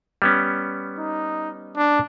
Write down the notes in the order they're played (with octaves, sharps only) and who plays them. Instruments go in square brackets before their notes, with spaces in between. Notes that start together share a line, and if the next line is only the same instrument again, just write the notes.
[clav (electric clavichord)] G3 B3 C#4
[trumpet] D#4
D4